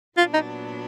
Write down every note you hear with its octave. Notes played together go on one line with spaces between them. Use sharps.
A#2 F#3 B3 D4 F4
D#4